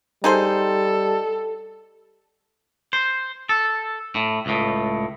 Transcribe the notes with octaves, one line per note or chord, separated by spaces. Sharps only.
G3 D#4 G#4 A4 C5
C5
A4
A2
C#2 A2